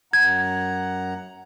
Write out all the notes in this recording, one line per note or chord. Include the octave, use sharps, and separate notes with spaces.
F#2 F#5 A#5 G#6